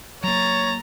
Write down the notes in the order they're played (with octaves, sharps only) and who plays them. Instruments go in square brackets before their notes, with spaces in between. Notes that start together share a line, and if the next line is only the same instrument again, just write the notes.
[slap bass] F#3 A#3 [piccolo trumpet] C#5 [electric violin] A#5 A6